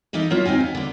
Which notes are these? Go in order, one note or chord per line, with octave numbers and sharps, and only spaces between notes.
E3 A#3 D#4 E4 A4 D#5
F#3 A#3 E4 F4
D2 C4 D#4 F5 G#5
B3
D3 A#3